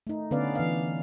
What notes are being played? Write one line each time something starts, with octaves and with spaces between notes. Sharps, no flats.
A3 D#4
D3 B3 C#4 B4 D5 F5
E3 F5